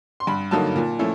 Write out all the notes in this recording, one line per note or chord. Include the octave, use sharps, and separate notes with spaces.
C6
G2 B5
D3 F#3 A#3 D#4 A5
A#2
F3 A3 C#4 E4